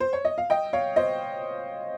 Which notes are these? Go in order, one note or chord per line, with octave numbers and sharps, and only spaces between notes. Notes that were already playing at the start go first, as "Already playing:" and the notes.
C5
C#5
D#5
F5
D#5 G5
C#5 F5
C5 D#5